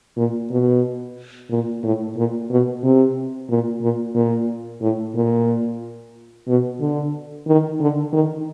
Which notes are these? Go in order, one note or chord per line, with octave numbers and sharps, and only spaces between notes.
A#2
B2
A#2
A2
A#2
B2
C3
A#2
A#2
A#2
A2
A#2
B2
D3
D#3
D3
D#3